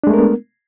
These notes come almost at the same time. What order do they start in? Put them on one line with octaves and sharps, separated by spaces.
D4 G#3 A3 A#4 B3